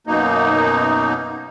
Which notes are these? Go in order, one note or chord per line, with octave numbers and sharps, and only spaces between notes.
F#2 B2 A#3 D#4